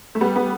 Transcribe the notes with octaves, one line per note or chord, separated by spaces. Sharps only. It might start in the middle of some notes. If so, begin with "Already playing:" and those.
A3
G3 B3
G3 B3